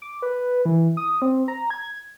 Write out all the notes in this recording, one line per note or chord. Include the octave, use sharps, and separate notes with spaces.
D6
B4
E3
D#6
C4
A#5
G#6